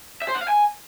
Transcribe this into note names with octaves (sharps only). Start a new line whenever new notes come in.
E5
C5
F#5
F5
G#5